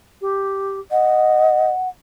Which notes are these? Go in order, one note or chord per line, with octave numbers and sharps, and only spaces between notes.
G4
D#5 F#5